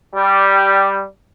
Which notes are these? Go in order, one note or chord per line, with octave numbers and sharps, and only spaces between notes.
G3